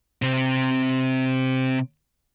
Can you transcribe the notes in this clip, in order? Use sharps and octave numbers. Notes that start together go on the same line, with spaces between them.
C3 C4